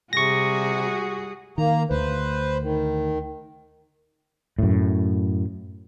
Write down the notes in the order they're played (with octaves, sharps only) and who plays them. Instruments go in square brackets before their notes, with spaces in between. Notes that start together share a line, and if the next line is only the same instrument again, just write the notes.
[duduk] C3 [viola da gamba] G3 F#4 G#4 [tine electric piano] C#6 A#6
[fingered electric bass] D#3 [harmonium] A#3 A#5
[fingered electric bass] D2 [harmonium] B4 C5
[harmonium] D#3
[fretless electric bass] F#2 A2